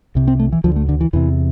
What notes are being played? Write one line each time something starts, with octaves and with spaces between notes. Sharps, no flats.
C2 C3
C4
A3
E3
D2 D3 F3
A3
D3
E3
E2 C3 E3